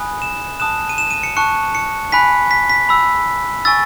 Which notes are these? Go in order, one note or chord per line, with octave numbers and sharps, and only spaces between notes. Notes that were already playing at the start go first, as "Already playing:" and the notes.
Already playing: G#5 B5 D#6 F#6
E7
A5 D#6 F#6 E7
D#7
E7
D#7
C#7
A5 C#6 F#6 C#7
C#7
G#5 B5 F#6 B6
B6
B6
B5 E6
G#5 C#6 E6 A6